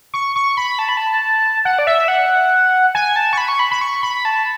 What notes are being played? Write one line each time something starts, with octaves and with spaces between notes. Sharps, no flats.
C#6
C#6
B5
A5
B5
A5
F#5
D5
E5
F#5
G#5
A5
C#6
B5
C#6
B5
B5
C#6
B5
A5